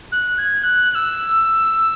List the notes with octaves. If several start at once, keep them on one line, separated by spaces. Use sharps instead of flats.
F#6
G#6
F#6
F#6
E6